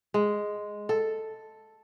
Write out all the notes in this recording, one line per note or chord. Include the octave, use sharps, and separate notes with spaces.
G#3
A4